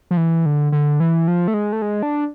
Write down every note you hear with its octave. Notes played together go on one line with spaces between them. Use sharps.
F3
E3
D3
D3
E3
F3
A3
G#3
A3
G#3
D4